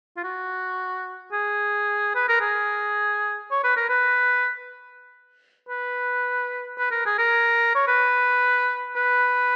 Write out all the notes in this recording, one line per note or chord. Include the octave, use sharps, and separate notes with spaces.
F4
F#4
G#4
B4
A#4
G#4
C#5
B4
A#4
B4
B4
B4
A#4
G#4
A#4
C#5
B4
B4